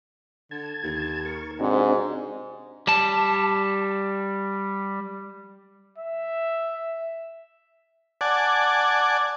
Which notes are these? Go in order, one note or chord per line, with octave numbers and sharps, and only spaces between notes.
D3 A5 G#6
D#2
A#4 C#6
G#2 C3 C4 D4 F#4
G3 A5
E5
D5 F#5 G#5 A5